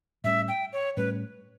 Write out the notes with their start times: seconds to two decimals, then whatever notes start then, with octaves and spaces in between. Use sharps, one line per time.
0.24 A2 G3 C#4 E5
0.48 G5
0.73 C#5
0.97 A2 G3 C#4 B4